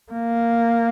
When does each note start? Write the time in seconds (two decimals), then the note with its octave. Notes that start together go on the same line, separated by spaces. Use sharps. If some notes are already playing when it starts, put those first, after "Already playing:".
0.12 A#3